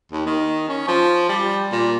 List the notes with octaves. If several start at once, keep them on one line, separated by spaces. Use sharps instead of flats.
D#2
D#3
C#4
F3
G3
A#2